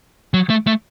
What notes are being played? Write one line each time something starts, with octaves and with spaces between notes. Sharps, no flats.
F#3
A3
A3